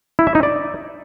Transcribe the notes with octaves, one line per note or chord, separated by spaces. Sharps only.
E4
E5
D#4
D5